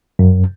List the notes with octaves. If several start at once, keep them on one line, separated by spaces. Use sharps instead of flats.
F#2